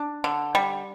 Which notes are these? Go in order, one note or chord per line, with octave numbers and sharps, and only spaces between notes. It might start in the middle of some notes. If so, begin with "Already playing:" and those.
Already playing: D4
D3
G3